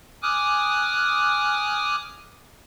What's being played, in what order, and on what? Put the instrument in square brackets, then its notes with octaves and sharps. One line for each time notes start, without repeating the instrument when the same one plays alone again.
[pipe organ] G#5 D6 D#6 F6 F#6